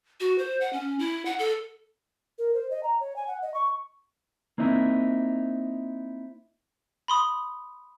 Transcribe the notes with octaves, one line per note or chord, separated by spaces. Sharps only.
F#4
C5
F#5
C#4
E4
F#5
A4
A#4
C5
D#5
A#5
C#5
G#5
F#5
D#5
C#6
A#3 C4 D#4 E4
B5 C6 D#6